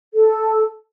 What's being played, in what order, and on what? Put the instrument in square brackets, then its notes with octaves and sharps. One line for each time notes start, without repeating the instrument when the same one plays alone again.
[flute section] A4